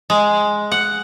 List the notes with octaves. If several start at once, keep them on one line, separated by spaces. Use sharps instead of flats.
G#3
F#5